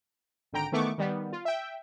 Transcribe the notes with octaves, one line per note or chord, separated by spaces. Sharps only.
G#1 D3 G5 A#5 D7
D#3 E3 A3 B3 C#6 D6
D#3 G3 B3
F4
E5 G5